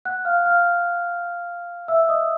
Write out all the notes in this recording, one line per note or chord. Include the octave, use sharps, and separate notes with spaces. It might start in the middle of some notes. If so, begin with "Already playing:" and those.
F#5 F#6
F5 F6
F5 F6
E5 E6
D#5 D#6